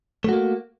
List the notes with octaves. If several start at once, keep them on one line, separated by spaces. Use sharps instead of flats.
A3 A#3 F#4